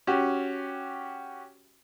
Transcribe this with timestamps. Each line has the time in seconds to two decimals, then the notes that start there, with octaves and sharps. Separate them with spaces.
0.07 C#4 F#4 G4